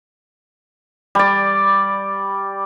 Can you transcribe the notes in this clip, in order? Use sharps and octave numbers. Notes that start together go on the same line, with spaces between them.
G3 D5